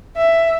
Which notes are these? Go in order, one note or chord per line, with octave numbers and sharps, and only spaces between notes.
E5